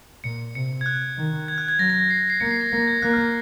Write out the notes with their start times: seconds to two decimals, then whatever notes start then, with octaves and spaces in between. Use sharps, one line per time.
0.24 A#2 C#7
0.54 C3 C#7
0.81 G#6
0.86 F#6
1.17 D#3
1.48 G#6
1.58 F#6
1.68 G#6
1.79 F#3 A#6
1.90 A#6
2.00 A#6
2.10 C7
2.30 C7
2.40 A#3 C#7
2.51 C7
2.61 A#6
2.72 A#3 A#6
2.88 G#6
3.02 A#3 F#6
3.13 F6